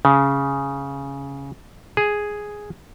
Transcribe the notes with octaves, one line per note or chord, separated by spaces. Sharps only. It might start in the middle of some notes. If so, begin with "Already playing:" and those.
C#3
G#4